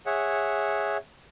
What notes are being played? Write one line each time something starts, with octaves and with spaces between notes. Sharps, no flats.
G#4 C#5 E5 F#5